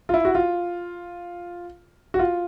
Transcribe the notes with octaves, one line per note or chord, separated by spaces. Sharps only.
F4
E4
F#4
F4
F#4
F4